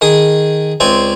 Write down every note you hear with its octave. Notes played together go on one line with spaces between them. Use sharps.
D#3 G#4 D#6
C#2 C4 D5 G#5